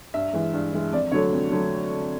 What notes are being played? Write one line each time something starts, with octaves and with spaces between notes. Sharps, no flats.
G2 E5
E3 G#3
G2
E3 G#3
F2 D5
D3 F#3 A3 C#5
F2
D3 F#3 A3